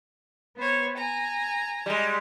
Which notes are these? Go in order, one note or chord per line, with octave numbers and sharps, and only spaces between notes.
B3 C5 C#5
G#5 A#5
G3 G#3